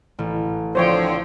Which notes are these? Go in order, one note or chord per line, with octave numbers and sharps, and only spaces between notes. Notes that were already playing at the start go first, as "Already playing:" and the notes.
A1
D3 F3 C4 C5 C#5 G5